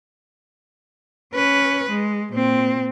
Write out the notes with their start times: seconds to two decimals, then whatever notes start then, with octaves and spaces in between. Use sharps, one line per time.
1.35 C#4 B4
1.90 G#3
2.33 A#2 C4